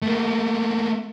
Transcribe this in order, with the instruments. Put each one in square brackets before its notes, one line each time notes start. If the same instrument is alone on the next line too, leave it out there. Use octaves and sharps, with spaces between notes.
[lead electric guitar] A3 A#3